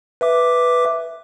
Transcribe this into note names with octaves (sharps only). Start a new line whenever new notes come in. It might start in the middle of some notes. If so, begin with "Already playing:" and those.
B4 E5 D6